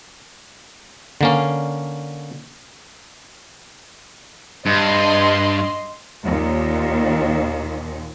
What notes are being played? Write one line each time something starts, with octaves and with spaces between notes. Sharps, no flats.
D3 A#3 C#4
G2 D#5 C6
D#2 A#2